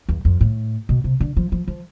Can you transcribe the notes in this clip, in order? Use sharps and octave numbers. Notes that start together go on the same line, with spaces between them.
E2
F2
A2
B2
C3
D3
F3
F3
F3